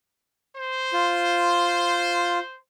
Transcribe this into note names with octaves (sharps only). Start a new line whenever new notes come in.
C5
F4